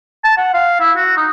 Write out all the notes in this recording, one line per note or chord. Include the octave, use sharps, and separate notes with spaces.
A5
F#5
F5
E4
F#4
D#4